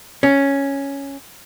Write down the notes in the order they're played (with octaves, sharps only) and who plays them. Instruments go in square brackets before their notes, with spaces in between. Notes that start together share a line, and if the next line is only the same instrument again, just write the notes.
[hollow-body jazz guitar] C#4